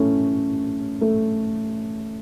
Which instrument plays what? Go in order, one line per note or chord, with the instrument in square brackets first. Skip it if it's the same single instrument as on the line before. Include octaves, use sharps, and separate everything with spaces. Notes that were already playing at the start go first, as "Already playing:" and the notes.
Already playing: [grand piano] A2 E3 A3 C#4
A3